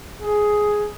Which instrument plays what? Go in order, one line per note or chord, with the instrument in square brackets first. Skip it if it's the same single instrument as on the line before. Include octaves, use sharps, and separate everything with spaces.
[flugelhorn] G#4